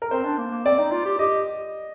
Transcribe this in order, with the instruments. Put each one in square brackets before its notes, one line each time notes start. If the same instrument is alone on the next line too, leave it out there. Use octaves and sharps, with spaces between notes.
[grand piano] A#4
[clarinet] C4 [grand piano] C5
[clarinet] D4
A#3
A#3
[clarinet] C4 [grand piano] D5
[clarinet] D#4
F4
G4
[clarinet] G4 [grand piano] D#5